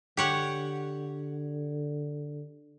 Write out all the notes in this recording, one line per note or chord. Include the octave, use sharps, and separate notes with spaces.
D3 G4 C#5 F#5